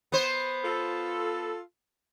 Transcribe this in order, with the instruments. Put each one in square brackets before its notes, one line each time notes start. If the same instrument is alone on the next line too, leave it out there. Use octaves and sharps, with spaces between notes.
[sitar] B3 C5
[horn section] F4 A4